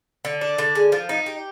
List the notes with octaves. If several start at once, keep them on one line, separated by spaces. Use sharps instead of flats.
D3
D4
D3
G#3
F3
D#4
G4